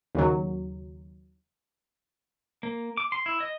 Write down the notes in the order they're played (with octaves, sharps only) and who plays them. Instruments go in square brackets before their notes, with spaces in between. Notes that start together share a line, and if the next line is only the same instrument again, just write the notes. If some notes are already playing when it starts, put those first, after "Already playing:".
[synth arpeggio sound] D#2 C#3 F#3
[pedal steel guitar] A#3
D6
C6
E4
D#5